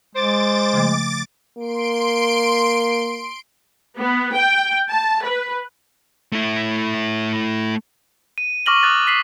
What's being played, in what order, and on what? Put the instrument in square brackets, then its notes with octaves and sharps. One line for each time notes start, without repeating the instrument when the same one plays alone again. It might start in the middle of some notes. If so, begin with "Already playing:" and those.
[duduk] G#3 [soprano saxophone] C5 [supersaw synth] D6 A6
[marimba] C#3 F3 A3
[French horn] A#3 [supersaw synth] C6 D7
[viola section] B3
G5
A5
B4
[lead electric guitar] A3 E4
[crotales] D#7
C#6 D6 F6 A#6 F#7 G7
D#6 F#6 A6
B6 C7 F#7